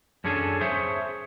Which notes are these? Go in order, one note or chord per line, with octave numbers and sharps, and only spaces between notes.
F#2 C#4 D4 G#4 A4 G#5
G#4 C5 C#5 E5